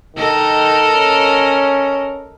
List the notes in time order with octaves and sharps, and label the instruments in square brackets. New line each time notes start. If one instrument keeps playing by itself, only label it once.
[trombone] D#3 [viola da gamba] A4 A#4 D#5
[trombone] C#4